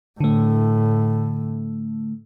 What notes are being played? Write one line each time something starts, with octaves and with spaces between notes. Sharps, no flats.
A2 D3 A3